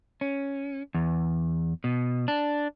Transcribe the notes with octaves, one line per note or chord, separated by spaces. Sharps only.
C#4
E2
B2
D4